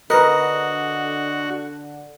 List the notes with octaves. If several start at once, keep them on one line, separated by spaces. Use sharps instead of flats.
D3 F#4 A#4 B4 D#5